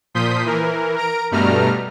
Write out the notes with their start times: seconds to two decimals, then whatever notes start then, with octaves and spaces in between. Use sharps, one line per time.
0.15 A#2 F3 C6 D#6 G6 B6
0.45 E3 A#4
0.96 A#4 A#5 D7
1.31 G2 B2 G3 A3 A#5 F6